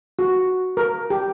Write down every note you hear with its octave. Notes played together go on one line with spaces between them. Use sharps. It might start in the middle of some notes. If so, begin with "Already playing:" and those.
F#4
A#4
G4